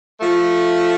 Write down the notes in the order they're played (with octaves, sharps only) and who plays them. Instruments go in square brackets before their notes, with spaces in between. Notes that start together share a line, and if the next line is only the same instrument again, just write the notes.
[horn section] F3 A3